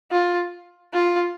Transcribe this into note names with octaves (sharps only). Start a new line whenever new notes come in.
F4
F4